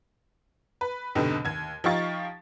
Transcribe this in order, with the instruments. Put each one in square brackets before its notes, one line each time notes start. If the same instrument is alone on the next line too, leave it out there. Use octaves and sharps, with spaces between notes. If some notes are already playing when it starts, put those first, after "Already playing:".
[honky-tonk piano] B4
F1 G#2 B2 D3 G4
D#2 G#6
F3 D#4 G4 F5 C#6 A6